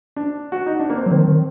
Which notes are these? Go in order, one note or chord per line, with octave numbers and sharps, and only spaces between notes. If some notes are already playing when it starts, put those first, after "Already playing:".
D4
F#4
D#4
D4
A#3
C4
F#3
D#3 C4
D#3